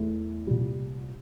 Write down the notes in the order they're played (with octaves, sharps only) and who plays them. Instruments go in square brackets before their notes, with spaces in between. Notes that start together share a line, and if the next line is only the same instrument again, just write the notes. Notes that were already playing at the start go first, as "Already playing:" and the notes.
Already playing: [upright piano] E2 E3 A3
C2 A#2 G3